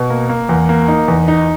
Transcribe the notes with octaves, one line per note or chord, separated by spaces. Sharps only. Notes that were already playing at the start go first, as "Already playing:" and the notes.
Already playing: B2
A#3
A#3
E2
A#3
D#4
E2
D#4